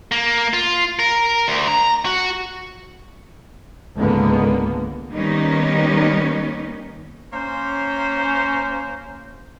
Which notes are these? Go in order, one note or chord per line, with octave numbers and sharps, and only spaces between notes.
A#3
F4
A#4
D2
A#5
F#4
C#2 G#2 D3 G#3 A#3 B3
D#3 G3 A#3 B3 C#4 D#4
A#3 C#4 C5